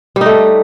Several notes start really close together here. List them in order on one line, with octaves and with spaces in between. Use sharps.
G3 D#4 A3